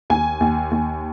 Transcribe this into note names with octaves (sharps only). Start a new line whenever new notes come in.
D#2 G#5
D#2
D#2